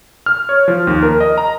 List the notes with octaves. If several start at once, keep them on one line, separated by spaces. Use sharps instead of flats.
F6
C#5
F3
D#2
A#4
D#5
A#5